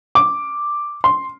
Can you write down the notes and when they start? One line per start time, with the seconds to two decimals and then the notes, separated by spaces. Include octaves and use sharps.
0.15 D6
1.04 C6